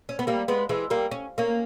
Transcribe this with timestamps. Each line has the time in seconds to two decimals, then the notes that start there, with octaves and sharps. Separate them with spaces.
0.09 C#4
0.19 B3
0.27 G3 A#3
0.48 G#3 B3
0.69 E3 G#3
0.90 G3 A#3
1.11 C#4
1.38 A#3 C#4